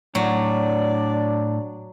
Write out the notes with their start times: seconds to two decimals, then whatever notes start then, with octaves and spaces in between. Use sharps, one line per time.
0.15 A2 F#3 D4 D5